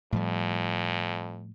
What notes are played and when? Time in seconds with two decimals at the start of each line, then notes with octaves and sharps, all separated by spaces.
0.12 F2 A2 F3 G3